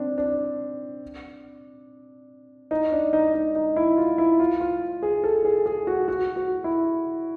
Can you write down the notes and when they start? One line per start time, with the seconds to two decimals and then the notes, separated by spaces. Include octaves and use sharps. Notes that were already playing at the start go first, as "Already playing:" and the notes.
Already playing: C4 D4
0.18 D4
2.71 D#4
2.92 D4
3.13 D#4
3.34 D#4
3.55 D#4
3.76 E4
3.97 F4
4.18 E4
4.40 F4
4.60 F4
5.03 G#4
5.24 A4
5.45 G#4
5.66 G#4
5.87 F#4
6.08 F#4
6.36 F#4
6.64 E4